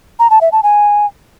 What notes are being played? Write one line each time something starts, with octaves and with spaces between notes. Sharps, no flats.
A#5
A5
E5
A5
G#5